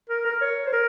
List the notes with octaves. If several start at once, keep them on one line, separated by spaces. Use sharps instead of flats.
A#4
A#4
C#5
C5
A#4